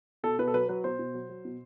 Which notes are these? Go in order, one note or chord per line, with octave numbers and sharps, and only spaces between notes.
B2 A4
B2 B4
A4
F#3 B4
F#3 B4
B2 C5
B2
F#3
F#3
B2